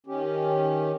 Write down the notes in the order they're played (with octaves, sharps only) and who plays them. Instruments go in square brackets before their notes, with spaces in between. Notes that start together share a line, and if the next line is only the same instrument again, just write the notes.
[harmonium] D#3 C#4 G4